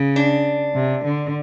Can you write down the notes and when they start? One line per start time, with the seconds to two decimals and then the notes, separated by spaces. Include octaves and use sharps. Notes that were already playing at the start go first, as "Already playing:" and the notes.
Already playing: C#3
0.16 D4
0.75 C3
1.04 D3